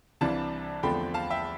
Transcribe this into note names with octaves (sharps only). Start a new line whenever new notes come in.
C2 C3 E3 G3 D4 F5 A5
E2 D3 F3 A3 C4 G5 B5
F5 A5
E5 G5